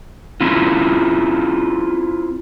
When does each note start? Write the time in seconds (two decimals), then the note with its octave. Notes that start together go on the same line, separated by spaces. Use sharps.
0.41 C4 E4 F4